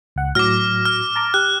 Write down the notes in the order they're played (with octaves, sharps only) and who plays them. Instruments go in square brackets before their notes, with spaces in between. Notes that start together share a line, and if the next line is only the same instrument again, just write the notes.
[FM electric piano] C#2 F#5
[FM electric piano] A2 F#3 A#6 [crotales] D6 F6
[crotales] F6
[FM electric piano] A5 A#5 D6
[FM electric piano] G4 [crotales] F#6